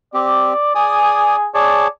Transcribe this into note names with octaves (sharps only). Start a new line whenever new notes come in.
C4 G4 D5
G#4 D5 G#5 D#6
G#4 C#5 D5 A5